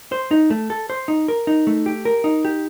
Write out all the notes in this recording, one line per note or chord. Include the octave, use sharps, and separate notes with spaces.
C5
D#4
A3
A4
C5
D#4
A#4
D#4
A3
G4
A#4
D#4
G4